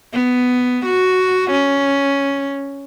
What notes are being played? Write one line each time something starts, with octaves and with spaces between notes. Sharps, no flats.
B3
F#4
C#4